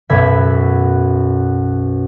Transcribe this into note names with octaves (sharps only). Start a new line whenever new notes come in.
B1 F#2 B4 E5 G#6 B6